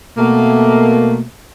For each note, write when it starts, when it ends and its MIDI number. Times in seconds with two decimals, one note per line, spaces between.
0.17 1.22 47
0.17 1.22 57
0.17 1.22 58